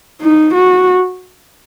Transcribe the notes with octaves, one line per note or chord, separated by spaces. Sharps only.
D#4
F#4